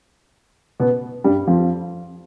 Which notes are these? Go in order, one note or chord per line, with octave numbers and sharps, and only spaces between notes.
B2 B3
G2 G3
F2 F3